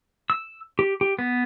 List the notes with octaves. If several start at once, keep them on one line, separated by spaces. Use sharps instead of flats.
E6
G4
G4
B3